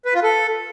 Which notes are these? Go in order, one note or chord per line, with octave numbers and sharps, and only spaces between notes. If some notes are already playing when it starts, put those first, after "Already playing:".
B4
F4
A4